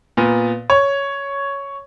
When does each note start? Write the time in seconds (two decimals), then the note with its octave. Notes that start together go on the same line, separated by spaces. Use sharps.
0.17 A#2 B3
0.70 C#5